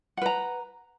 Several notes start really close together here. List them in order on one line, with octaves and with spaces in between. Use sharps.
F#5 B4 A#5